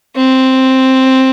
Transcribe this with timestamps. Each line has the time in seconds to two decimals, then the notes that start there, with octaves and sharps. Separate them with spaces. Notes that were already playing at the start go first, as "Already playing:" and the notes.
0.16 C4